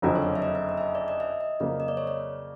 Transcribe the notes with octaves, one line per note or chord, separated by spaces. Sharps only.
F#1 F2 D3 F#3 D#5
C#5
D5
E5
D#5
E5
D#5
E5
D#5
D5
D#5
E5
D#5
F2 C#3 F#3 A#3 D5
D#5
D5
C#5
D5